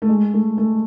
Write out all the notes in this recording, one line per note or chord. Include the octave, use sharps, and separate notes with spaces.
A3
G#3
A3
A3